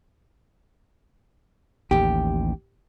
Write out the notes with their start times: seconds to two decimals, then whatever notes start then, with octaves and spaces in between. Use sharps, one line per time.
1.91 A1 D#2 G4